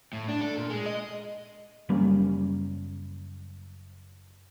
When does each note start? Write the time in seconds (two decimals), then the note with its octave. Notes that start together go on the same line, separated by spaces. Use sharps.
0.13 A2
0.28 D4
0.41 A4
0.57 A#2
0.70 G#3
0.86 D#5
1.89 F#1 G3 A#3 C#4